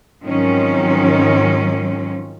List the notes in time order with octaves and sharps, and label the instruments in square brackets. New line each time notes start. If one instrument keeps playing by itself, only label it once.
[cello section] G#2 D#3 F3 F#3 C4 C#4